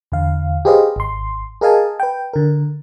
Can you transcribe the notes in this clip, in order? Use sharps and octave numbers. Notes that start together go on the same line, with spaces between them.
E2 D3 F5
G4 G#4 B4 C5 D#5 F5
G#1 C6
G#4 A#4 D#5 F5 G#5 A5
B4 G5
D3 A#4